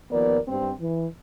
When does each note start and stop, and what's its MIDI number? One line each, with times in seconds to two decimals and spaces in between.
0.11 0.38 39
0.11 0.38 53
0.11 0.38 59
0.11 0.38 70
0.11 0.38 74
0.48 0.71 43
0.48 0.71 55
0.48 0.71 60
0.79 1.05 52